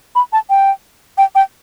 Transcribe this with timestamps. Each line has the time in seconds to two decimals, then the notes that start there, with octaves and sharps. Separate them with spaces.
0.15 B5
0.33 A5
0.50 G5
1.18 G5
1.35 G5